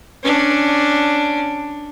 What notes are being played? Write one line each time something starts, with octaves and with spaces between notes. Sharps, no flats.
C#4 D4